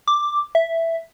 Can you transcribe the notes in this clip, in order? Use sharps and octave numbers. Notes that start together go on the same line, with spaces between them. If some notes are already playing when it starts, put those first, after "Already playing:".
D6
E5